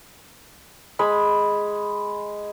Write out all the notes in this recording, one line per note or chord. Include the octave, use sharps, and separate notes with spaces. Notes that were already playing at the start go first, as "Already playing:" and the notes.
G#3 B5